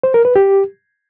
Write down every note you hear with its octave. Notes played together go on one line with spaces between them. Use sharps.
C5
A#4
B4
G4